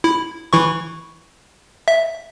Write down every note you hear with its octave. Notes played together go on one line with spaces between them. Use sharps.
E4
E3 E4 C#6
E5